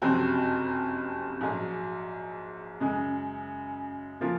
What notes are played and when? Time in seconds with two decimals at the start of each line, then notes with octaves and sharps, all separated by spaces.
0.02 F#1 F2 C3 F#3 C4
1.41 A#1 G#2 F#3
2.80 F#2 C#3 G#3
4.20 C#3 F3 A#3 F4